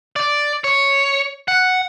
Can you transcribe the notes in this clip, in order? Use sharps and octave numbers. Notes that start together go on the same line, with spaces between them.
D5
C#5
F#5